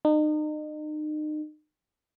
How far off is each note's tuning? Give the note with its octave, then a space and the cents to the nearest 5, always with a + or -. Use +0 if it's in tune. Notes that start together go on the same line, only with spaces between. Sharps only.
D#4 -35